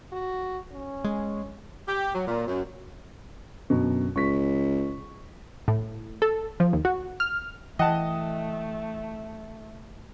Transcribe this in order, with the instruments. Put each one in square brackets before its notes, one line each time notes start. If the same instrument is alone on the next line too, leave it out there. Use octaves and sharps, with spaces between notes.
[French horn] F#4
C#4
[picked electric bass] G#3
[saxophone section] G4
F#3
A#2
F#2
[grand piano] F#2 B2 D3
[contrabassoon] C#2 [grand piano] C#6 B6
[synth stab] A2
A4
F3
D#2
F#4
F6
[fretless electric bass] E3 [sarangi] A3 [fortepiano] D#5 F#5 A5 [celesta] G5